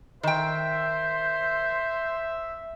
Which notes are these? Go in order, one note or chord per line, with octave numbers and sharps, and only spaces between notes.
D#3 C5 E5 G5